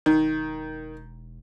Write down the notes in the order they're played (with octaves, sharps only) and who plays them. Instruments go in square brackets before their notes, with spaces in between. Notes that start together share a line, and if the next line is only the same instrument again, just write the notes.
[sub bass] E1 [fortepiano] D#3